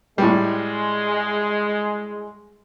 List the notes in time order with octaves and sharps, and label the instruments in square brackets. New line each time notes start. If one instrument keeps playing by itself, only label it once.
[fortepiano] A2 G3 [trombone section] G#3